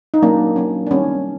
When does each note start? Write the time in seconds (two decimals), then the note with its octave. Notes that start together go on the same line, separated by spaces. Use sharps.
0.14 D#4
0.23 F#3 A#3 C#4 D4
0.56 F#3 A#3 C#4
0.86 D4
0.91 D#3 G3 C4 C#4